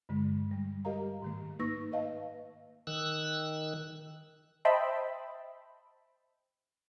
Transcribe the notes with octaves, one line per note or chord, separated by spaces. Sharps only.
G2 D3 G#3
G3
G4 A#4 D#5 F5 A#5
G#2 D#3 A3
A#3 D#4 B4 C#6 E6 A#6
B4 D#5 F5 A5
D#3 E6 F#6
C5 D#5 E5 G5 A5 B5